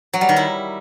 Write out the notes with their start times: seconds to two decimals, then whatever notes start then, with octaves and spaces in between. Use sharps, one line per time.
0.14 F#3
0.21 G3
0.29 D#3
0.36 E4